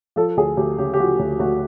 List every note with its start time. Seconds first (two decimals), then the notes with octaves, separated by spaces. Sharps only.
0.16 F3 A4
0.37 D2 G#4
0.57 D2 G4
0.78 C#3 G4
0.94 G4
0.99 F3 F#4
1.19 D2
1.39 D2 F#4